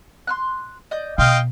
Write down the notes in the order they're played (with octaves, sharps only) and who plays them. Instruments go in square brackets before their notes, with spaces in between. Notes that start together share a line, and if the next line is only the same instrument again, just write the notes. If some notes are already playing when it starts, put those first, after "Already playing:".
[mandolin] C6 F6 F#6
D5 D#5 G6
[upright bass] B2 [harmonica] D#5 F5 G5 [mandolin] C6 F6